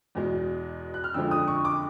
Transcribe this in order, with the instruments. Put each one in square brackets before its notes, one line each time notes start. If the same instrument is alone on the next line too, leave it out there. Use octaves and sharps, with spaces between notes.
[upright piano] E2 B2 G#3
F#6
F6
F2 D3 F3 G#3 E6
D#6
C#6
D6